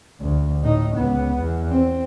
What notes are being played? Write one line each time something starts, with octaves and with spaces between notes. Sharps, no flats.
D2
A2 D#4
C#2 B3
E2
C4